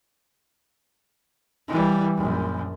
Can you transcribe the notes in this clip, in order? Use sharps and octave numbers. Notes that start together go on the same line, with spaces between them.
E3 G3
A#1 F#2